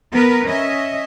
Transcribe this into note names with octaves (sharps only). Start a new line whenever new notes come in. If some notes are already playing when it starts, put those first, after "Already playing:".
B3 A#4 B4
C#4 D#5 E5